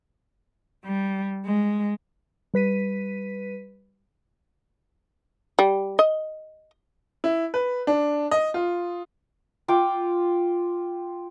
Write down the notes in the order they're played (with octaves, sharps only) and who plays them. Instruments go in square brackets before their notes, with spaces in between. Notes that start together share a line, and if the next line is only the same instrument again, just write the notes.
[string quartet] G3
G#3
[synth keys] G3 B4 B6 D#7
[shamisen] G3
D#5
[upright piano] E4
B4
D4
D#5
F4
[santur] F4 G5 D6